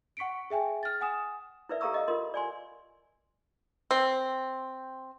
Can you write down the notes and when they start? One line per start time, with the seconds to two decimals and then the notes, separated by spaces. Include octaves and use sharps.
0.17 F#5 C#6 B6 C#7 D7
0.50 G#4 E5 G5 G#5
0.83 F6 A6
1.01 F#5 G#5 D#6 E7
1.69 E4 A#4 B4 D5 E5
1.81 G4 A4 F5 A#5 C#6 E6
1.94 D#5 F5
2.08 F4 A#4 D#5 C6
2.34 D5 G#5 C6
3.91 C4